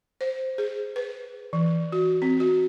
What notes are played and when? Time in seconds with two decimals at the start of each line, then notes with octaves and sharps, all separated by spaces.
0.21 C5
0.58 G#4
0.96 B4
1.53 E3
1.92 F#4
2.22 C4
2.40 F#4